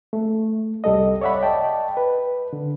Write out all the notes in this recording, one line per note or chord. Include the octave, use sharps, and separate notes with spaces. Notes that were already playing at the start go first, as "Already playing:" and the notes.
A3
C2 G3 A4 D#5
C#5 D5 E5 F#5 B5
D5 D#5 G5 A5
B4
D3